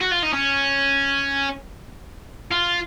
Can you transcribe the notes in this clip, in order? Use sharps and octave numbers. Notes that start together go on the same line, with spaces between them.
F#4
F4
D#4
C#4
F4